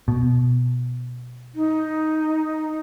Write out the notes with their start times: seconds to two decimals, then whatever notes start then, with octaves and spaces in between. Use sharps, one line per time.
0.08 B2
1.55 D#4